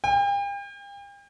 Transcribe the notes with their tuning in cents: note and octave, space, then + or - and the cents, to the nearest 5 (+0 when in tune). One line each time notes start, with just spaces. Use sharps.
G5 +40